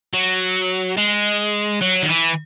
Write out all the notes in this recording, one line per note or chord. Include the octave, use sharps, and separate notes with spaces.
F#3
G#3
F#3
D#3
E3